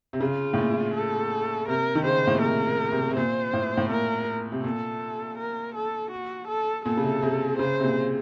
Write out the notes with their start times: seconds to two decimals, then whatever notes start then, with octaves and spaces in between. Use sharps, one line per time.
0.13 C3
0.20 C#3 F4
0.54 A2
0.58 A#2
0.95 A4
1.68 C3 A#4
1.95 D#3
2.05 C#3 C5
2.27 A2
2.35 A#2
2.42 C3 A#4
2.92 C3
3.11 C3
3.17 A#2 C5
3.53 A2
3.77 A2
3.90 A#2 A#4
4.52 C3
4.64 A#2 A4
5.38 A#4
5.75 A4
6.11 F#4
6.48 A4
6.85 A#2 A4
6.97 C#3
7.04 C3
7.23 C3
7.59 C#3 C5
7.80 C3
7.84 A#2